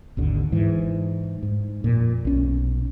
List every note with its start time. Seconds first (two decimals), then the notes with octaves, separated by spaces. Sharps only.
0.17 G#1 D#2 D3
0.52 G#2 E3
1.42 G#2
1.84 F2 A#2
2.25 B1 C#4